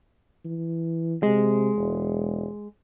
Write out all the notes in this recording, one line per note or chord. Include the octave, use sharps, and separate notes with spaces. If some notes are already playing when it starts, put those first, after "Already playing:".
E3
C3 G#3
E1